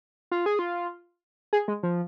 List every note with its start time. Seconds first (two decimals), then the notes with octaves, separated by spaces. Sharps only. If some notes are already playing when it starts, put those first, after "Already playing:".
0.31 F4
0.46 G#4
0.59 F4
1.53 G#4
1.68 G#3
1.83 F3